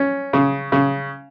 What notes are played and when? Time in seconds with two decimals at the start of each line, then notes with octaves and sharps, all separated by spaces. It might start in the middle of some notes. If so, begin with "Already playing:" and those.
Already playing: C#4
0.33 C#3
0.72 C#3